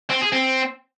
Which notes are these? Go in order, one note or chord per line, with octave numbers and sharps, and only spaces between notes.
C4
G#4
C4